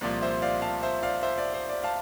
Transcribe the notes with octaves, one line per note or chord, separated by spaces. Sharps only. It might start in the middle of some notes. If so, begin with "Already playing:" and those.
C2 A#2 F3 D5
C5 E5
D5 F5
F5 A5
C5 E5
D5 F5
C5 E5
D5
C5
D5
F5 A5